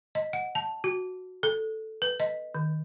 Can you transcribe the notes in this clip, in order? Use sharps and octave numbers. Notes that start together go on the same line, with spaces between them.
D#5
F#5
A5
F#4
A4
B4
D#5
D#3